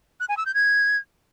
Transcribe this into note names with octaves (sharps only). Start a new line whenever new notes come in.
F#6
G#5
E6
G6
G#6